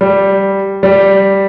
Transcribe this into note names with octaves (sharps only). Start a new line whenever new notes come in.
G3
G3